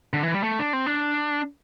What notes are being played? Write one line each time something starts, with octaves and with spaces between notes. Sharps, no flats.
D3
E3
G3
A3
D4
C4
D4